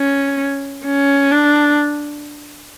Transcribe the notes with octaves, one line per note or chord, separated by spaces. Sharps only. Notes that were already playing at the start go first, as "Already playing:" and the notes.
Already playing: C#4
C#4
D4